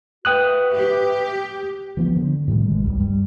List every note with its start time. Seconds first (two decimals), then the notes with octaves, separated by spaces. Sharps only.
0.25 F#4 B4 E5 G5 D#6 F#6
0.75 G4
1.97 E3 F3 B3
2.17 D3
2.48 A2 C3 D#3 G3
2.68 A1 G#3
2.85 D1 G#1 C#2 G3
2.97 G2 G3